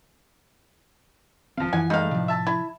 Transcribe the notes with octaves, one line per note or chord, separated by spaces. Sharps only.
D#1 A#1 F3 C4 F5
F#2 E3 E4 F#5 G#5
G2 G#3 A3 D#4 F5
A2 C3 F3
E5 A5
E4